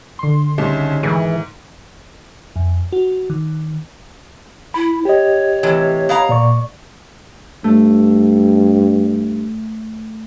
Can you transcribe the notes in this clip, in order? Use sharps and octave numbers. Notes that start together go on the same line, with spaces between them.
D3 C6
C2 C#3 C#4 D#4
G#2 D#3 E3 G#4
F2
F#4
D#3
E4 B5
G4 C#5 D#5
A2 C3 E3
B3 F5 A#5
A#2 D5 C#6
G2 A3